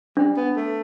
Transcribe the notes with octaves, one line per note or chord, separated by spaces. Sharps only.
G3 D4
B3
A3